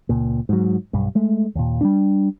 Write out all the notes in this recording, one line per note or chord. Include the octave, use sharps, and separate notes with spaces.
C#2 A#2
G#2 F#3
B1 G2
G#3 A3
D#2 A#2
G3 A#3 D4